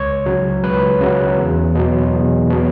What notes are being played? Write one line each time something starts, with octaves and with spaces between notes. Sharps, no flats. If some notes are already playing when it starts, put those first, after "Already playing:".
Already playing: C#2 C#5
C#3 F#3
C#2 B4
C#3 F#3
E2
B2 F#3
E2
B2 F#3